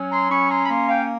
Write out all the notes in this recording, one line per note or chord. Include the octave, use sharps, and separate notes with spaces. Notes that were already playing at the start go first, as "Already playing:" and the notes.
Already playing: F#3 C#4
A#5 C6
C#4 B5 C#6
A#5 C6
B5
A#3 A#5 C6
F5 G5